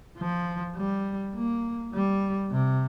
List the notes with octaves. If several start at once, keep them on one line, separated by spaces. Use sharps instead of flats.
F3
G3
A#3
G3
C3